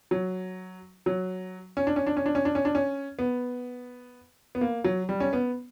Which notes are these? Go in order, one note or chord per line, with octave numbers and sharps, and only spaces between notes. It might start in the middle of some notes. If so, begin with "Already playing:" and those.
F#3
F#3
C#4
D4
C#4
D4
C#4
D4
C#4
D4
C#4
D4
C#4
B3
B3
A#3
F#3
G3
C#4
B3